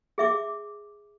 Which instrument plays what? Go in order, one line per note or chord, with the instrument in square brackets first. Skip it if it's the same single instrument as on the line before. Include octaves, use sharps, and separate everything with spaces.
[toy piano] G#4 E5 D6